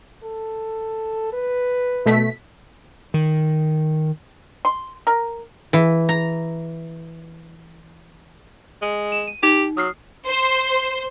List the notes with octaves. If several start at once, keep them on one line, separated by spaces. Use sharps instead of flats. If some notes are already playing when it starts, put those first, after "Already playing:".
A4
B4
B2 A3 B6
D#3
C6
A#4
E3
A#5
G#3
E7
D#7
D#4 G4
F#3 D#6 F6 C7
C5